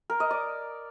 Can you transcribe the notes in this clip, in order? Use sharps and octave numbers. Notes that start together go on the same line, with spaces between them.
A#4
D#5
D5